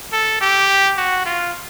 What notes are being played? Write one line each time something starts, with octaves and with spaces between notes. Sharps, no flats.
A4
G4
F#4
F4